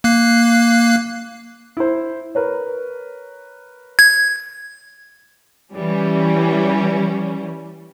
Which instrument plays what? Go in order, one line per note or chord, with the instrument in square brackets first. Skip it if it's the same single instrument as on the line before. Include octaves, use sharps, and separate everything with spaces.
[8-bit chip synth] A#3 F#6 C7
[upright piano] E4 C5
A#4 B4 C#5
[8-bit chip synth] G#6
[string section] E3 G3 C#4